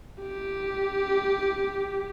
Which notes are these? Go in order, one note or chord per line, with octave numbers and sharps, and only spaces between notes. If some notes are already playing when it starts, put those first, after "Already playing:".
G4